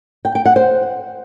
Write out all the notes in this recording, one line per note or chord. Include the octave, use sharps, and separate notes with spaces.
G5
G5
F#5
C5